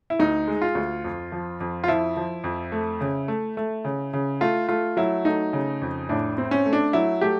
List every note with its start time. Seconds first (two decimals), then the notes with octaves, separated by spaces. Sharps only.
0.10 E4
0.20 D2 D#4
0.48 G#3
0.62 F4
0.75 D2
1.04 F2
1.32 F3
1.60 F2
1.84 F4
1.88 F3 E4
2.17 F3
2.44 F2
2.72 A3
3.01 C#3
3.28 A3
3.57 A3
3.85 C#3
4.13 C#3
4.41 A3 F4
4.69 A3 F4
4.97 F#3 E4
5.25 A3 D#4
5.53 C#3
5.82 F2
6.09 A2 D4
6.38 C4
6.51 C#4
6.66 A3
6.73 D4
6.93 F#3 E4
7.21 A3 G4